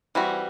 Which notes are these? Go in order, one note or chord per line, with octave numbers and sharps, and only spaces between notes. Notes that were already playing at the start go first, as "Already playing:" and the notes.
E3 G3 C4 F#4